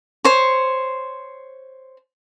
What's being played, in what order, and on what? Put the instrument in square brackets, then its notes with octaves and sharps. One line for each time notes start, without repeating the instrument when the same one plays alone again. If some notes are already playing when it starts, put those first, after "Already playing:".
[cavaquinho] C5 C#5